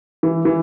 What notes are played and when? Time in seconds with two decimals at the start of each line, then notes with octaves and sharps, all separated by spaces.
0.23 E3
0.45 E3